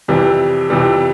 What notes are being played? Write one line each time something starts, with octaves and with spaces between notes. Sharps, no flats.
F2 C3 E3 G3
F2 C3 E3 G3